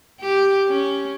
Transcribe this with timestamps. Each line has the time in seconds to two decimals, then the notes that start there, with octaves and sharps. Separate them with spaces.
0.20 G4
0.68 C#4